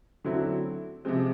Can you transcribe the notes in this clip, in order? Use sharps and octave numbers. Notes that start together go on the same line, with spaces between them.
D3 F#3 A3 C4 E4
C3 F3 G#3 C4